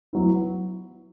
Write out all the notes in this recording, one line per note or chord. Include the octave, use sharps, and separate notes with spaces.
F#3 B3 E4